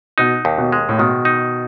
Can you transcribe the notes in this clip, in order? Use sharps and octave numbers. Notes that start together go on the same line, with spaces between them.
B2 D#4
D#2
B2
G#3
A2
B2 D#3
D#4